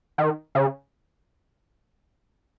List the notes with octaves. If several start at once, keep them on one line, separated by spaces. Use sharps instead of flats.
D#3
C#3